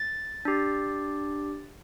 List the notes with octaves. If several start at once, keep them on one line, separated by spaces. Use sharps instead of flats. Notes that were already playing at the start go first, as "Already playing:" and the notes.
Already playing: A6
D4 G4